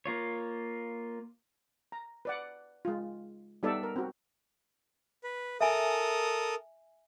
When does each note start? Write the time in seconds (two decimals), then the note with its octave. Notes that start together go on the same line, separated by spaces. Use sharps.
0.06 A#3 F4 C#5
1.92 A#5
2.25 B4 D5 F#5
2.85 G#3 F4
3.63 G3 B3 D#4 A4 D5 E5
3.83 A#4
3.96 C4 F#4
5.24 B4
5.61 A4 A#4 E5 G#5 D#6